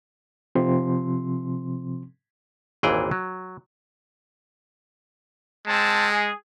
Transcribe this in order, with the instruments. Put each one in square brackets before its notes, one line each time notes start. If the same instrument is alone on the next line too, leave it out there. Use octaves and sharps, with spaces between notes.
[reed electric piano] C3 F3 C4 C6
[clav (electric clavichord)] G#1 D#2 A#2 E3 G#4 G5
F#3
[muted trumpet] G#3 [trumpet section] C4 A5
[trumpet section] G#4